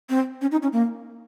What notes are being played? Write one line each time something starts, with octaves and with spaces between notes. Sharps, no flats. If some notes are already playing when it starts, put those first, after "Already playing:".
C4
C#4
D#4
C#4
A#3